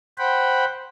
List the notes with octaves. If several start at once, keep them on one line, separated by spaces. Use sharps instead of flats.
C5 F#5 G5 B5